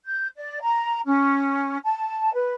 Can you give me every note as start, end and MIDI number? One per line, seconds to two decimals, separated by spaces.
0.05 0.27 91
0.36 0.59 74
0.61 1.00 82
1.06 1.77 61
1.84 2.32 81
2.32 2.54 71